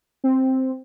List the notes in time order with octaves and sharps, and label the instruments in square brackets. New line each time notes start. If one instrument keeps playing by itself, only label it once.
[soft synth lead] C4